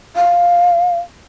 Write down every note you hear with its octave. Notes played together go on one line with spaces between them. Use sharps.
F5